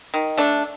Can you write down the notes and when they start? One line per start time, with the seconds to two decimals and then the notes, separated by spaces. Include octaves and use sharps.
0.14 D#3
0.38 A3 D4